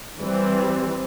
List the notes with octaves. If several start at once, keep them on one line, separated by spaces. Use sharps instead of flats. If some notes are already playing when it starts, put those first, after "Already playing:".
E3 G3 C4